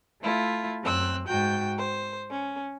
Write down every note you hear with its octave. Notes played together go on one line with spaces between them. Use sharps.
A3 E4 F4
F#2 C4 E6 F#6
G#2 F#4 G5 G6
C5
C#4